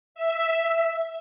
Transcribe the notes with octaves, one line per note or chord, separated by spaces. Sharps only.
E5